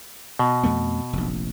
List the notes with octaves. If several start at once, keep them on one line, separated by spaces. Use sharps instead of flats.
B2
F2 A3 B3
F1 A#1